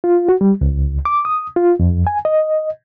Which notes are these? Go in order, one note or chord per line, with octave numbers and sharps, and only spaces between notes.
F4
F#4
G3
C#2
D6
D#6
F4
F2
G#5
D#5